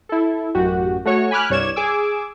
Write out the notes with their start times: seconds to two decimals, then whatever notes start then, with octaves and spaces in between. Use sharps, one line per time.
0.09 E4 A4
0.55 A1 F#2 F#4 G4
1.05 A3 F#4 C#5 C#6
1.31 G#5 B5 D6 F6 F#6
1.50 C2 G2 C#5 D5 G#6 E7
1.76 G#4 G#5 D6 E6